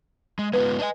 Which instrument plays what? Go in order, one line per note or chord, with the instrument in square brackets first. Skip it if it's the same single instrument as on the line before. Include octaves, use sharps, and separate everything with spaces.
[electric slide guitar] G#3
[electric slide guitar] G#3 B3 F4 [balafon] B4
[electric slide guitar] D4 D#5 G#5